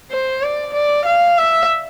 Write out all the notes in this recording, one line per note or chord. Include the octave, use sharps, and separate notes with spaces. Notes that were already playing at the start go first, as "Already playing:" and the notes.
C5
D5
D5
F5
E5